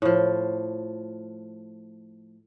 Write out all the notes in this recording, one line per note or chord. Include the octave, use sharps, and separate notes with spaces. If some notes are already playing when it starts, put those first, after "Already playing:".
A2 F3